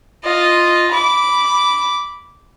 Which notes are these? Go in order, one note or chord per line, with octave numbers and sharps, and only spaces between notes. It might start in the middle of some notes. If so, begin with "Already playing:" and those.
F4 D#5
B5 D6